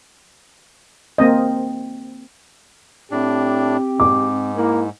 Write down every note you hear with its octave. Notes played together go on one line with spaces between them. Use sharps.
A#3 C4 D#5
A2 C4 D4 G4
G#2 D6
A#3 E4